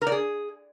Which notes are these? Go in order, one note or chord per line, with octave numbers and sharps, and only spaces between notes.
A#4
D5
G#4